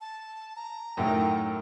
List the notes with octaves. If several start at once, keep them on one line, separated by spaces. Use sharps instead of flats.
A5
A#5
F#2 A2 D#3 G5